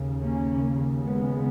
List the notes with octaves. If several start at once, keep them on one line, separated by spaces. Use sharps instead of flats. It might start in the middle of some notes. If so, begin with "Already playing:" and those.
Already playing: D#2 C#3
A#3 C#4
G#3 B3